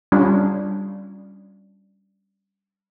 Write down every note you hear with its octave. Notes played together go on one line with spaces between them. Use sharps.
G3 C#4 D4 F4